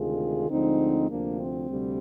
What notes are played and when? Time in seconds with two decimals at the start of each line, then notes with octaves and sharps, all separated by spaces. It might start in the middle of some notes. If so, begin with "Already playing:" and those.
Already playing: D2 C3 D#3 G#3 F4 G#4
0.50 D2 D3 F3 G#3 C4 D#4
1.09 D2 C3 F3 A#3 D4
1.40 C4
1.69 D2 C3 G3